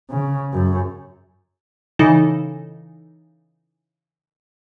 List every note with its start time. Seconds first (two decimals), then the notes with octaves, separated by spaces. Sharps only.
0.10 C#3
0.53 F#2
1.99 C#3 E3 D#4 A4